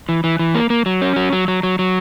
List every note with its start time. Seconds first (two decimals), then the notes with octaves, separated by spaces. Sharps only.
0.09 E3
0.24 E3
0.39 E3
0.55 A#3
0.70 A#3
0.86 F#3
1.01 C#4
1.16 F#3
1.33 F#3
1.48 F#3
1.63 F#3
1.79 F#3